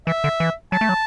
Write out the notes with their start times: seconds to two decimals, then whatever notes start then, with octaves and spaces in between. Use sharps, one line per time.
0.07 E3 E5
0.24 D3
0.40 E3
0.72 F#3 A5
0.81 A3
0.89 F#3